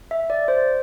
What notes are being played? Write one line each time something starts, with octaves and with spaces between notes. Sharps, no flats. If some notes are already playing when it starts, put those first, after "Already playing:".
E5
D5
C5